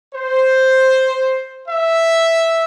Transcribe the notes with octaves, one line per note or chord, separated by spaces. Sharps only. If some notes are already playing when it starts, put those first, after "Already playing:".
C5
E5